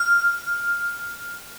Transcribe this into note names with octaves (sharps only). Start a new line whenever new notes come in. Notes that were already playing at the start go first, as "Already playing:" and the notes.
Already playing: F6